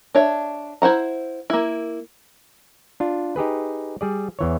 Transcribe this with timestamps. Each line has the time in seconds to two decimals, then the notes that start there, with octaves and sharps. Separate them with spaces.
0.15 D4 C#5 E5
0.82 E4 C5 F#5 A#5
1.50 A#3 E4
3.00 D4 F4
3.36 D#4 G4 G#4 B4
4.01 G3 G#4 D5
4.39 E2 E3 C#5